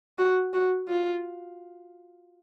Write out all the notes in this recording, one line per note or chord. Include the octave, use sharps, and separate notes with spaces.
F#4
F#4
F4